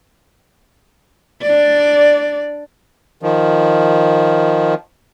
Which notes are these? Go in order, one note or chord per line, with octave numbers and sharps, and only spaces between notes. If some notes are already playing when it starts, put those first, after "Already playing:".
D4 D5
D#3 F3